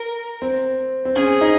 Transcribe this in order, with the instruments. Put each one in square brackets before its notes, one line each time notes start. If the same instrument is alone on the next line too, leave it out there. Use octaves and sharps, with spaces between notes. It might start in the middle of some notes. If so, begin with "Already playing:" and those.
Already playing: [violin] A#4
[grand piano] C4
C4
[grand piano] C#4 [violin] G#4
[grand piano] D#4